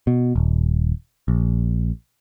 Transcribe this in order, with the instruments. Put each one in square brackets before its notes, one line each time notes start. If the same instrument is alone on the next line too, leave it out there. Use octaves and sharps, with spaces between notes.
[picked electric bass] B2
D#1
A#1